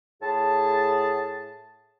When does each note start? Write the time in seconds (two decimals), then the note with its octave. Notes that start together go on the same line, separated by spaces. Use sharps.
0.22 A2 G#4 A5